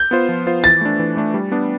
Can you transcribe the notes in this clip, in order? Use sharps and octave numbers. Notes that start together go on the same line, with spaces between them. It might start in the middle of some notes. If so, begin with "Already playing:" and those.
Already playing: G6
B3 F4 C5
F3
B3 F4 C5
E3 A6
A3 D4
E3
A3 D4
G3
B3 D4